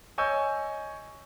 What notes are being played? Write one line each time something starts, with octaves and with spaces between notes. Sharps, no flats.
C#5 D#5 G#5 C#6 E6 G6